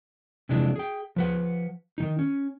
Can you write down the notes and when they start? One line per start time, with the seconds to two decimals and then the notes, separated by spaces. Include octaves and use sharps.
0.49 C3 E3 F3 G#3 D4
0.76 G#4 G5
1.16 F3 B4 F#5
1.98 D#3 E3 D#4
2.19 C#4